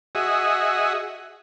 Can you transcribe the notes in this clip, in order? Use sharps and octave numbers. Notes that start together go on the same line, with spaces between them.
F#4 G#4 D#5 E5